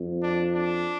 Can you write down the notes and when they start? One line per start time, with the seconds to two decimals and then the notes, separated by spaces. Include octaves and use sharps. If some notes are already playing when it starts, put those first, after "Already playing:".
Already playing: F2
0.22 D4
0.53 D4